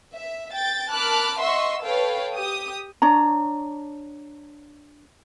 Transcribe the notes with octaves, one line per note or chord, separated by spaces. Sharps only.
E5
G5 A6
A#4 A5 B5 D6 F6 F#6
D#5 E5 F#5 C6 C#6 E6
A4 B4 C#5 F5 G5
G4 D#6
D4 C#5 A#5